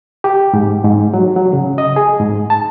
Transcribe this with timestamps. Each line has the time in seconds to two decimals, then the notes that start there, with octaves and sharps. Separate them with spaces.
0.24 G4
0.54 G#2
0.84 G#2
1.14 F#3
1.36 F#3
1.53 C#3
1.78 D#5
1.96 G#4
2.20 G#2
2.50 A5